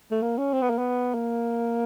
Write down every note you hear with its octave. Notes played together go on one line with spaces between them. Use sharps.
A3
A#3
C#4
C4
B3
A#3
B3
A#3